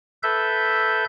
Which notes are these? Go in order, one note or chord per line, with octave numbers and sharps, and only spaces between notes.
A4 B4 E5 G6